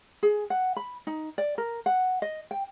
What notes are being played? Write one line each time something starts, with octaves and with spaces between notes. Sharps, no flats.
G#4
F#5
B5
D#4
D5
A#4
F#5
D#5
G5